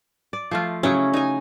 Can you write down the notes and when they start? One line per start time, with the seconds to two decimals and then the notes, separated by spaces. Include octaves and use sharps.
0.33 D5
0.51 F3 A3 F4
0.83 C#3 F#3 C#4 E4
1.14 D#4 G#5